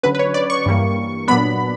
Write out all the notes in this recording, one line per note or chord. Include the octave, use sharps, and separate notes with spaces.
D3 F#3 C#4 B4
B4
C#5
D5
C#6
G2 E3 G3 A#3
A#2 F#3 B3 D4 B5